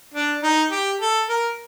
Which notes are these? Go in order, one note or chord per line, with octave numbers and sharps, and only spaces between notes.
D4
D#4
G4
A4
A#4